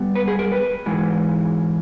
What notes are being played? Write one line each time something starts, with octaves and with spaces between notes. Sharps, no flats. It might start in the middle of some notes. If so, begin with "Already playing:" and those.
Already playing: G2 G3 B3
B4
G#4
A#4
B4
G#2 E3 G#3